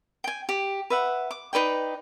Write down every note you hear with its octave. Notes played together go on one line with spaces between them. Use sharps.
G5 G#5
G4
B4 E5 F#5
D6
D#4 B4 D5 G5